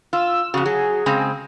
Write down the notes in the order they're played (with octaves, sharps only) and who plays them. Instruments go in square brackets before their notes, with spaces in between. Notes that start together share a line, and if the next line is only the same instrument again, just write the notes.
[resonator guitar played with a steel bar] F4 [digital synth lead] E6
[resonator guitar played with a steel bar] F2 C#3 [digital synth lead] F#4
[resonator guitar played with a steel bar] F#3 [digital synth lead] G#4
[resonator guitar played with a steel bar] C#3 G#3 C4